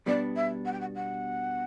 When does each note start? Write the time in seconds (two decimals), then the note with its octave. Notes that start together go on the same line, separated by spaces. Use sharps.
0.06 B2 G3 B3 D4 D5
0.36 E5
0.65 F#5
0.72 G5
0.80 F#5
0.95 F#5